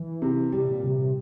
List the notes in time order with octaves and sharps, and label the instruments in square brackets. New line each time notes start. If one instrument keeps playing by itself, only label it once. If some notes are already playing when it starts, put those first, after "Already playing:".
Already playing: [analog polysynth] E3
[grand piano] C3
[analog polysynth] C3 [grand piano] G3
[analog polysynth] A#2
[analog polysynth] C3 [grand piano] G3
[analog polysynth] C3